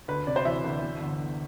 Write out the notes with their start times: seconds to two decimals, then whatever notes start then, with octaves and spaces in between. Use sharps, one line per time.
0.08 D2 B4
0.27 C3 D5
0.36 C5
0.45 E3 E5
0.64 D2
0.82 E3
1.01 G1
1.19 G1